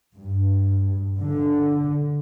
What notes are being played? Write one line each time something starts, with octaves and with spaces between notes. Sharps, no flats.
G2
D3